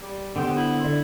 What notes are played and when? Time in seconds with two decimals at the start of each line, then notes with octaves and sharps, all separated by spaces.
0.01 G3
0.36 D3 B3 G4 C5
0.56 E4
0.84 D3